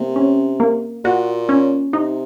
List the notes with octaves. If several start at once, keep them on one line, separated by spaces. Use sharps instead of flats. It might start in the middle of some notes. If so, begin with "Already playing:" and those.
Already playing: C3 A#3
C#4
A#3
A#2 F#4
C#4
C3 D#4